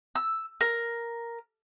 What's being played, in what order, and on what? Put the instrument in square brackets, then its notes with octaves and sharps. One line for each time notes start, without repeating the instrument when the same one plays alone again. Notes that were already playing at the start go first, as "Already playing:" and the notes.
[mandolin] E6
A#4